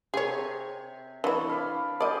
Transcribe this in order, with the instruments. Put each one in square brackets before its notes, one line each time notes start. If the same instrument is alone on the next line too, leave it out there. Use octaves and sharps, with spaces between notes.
[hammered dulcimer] C3 [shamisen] G#4 C#5
[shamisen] E3 E4 [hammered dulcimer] D4 C#5 B5
[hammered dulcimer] F5 B5 D6
[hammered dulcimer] G4 G#4 [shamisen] D5 D#5